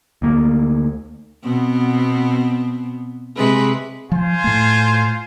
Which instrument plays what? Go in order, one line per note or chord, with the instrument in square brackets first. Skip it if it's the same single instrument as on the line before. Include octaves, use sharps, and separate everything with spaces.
[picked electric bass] D2 A#3
[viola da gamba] B2 B3 C4
C3 G#3 B4
[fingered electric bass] F3 [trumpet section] F4 C5 G#5
[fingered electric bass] A2 A3